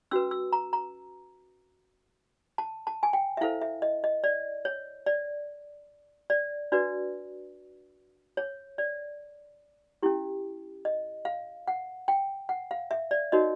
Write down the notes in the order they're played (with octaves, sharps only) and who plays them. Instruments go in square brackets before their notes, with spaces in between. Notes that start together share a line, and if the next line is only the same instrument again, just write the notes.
[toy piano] C#4 F#4 B4 E6
E6
A#5
A#5
A5
A5
G#5
G5
E5
E4 A4 C5 F5
E5
D#5
D#5
D5
C#5
D5
D5
D4 F#4 B4 D5
C#5
D5
C#4 E4 G4
D#5
F5
F#5
G5
F#5
F5
E5
D5
D#4 F#4 A#4 C#5 D#5